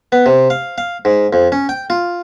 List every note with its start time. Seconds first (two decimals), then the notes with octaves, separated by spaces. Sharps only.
0.12 B3
0.26 C3
0.50 F5
0.78 F5
1.05 G#2
1.33 F2
1.52 C#4
1.69 G5
1.90 F4